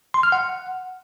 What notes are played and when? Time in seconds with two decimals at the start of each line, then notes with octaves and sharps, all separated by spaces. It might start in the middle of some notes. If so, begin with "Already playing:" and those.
0.14 C6
0.23 F6
0.32 F#5